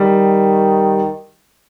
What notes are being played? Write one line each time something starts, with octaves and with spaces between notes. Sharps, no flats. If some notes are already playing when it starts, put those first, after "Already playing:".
Already playing: D#3 G3